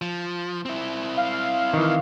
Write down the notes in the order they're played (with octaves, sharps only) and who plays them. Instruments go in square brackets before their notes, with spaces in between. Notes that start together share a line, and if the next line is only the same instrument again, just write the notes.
[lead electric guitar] F3
C4 E4
[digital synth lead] F5
[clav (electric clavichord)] D#3 E3